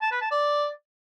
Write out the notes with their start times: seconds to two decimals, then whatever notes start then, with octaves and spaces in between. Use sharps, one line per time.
0.02 A5
0.11 B4
0.21 A5
0.31 D5